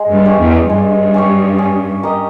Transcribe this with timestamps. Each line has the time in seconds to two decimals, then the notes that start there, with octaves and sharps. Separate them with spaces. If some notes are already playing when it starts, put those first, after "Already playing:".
Already playing: G#3
0.10 G2
0.25 C#4 G4 C#5
0.39 E2
0.69 G2 G#3
1.14 C#4 G4 C#5
1.58 C#4
2.03 G4 A#4 D#5